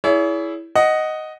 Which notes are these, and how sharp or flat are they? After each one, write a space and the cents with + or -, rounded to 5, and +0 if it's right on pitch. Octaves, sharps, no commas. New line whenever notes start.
E4 +0 G#4 +20 C#5 +45
D#5 +0 F#5 +10